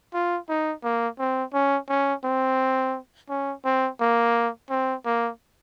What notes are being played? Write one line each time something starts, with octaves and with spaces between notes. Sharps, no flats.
F4
D#4
A#3
C4
C#4
C#4
C4
C#4
C4
A#3
C4
A#3